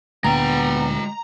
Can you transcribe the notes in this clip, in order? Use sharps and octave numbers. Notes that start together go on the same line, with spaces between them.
D2 A#2 D3 G#3 B3 G5 A#5